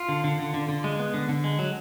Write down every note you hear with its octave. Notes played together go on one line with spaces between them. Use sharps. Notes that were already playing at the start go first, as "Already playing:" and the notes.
Already playing: F4
D3
D3
D3
D3
D3
G#3
B3
D3
D3
G#3
F#3